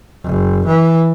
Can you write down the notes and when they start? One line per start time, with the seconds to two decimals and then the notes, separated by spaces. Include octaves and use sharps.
0.24 F#1
0.66 E3